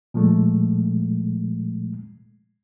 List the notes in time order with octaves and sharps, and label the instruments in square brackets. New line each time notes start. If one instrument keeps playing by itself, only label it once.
[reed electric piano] A#2 F3 G#3 A3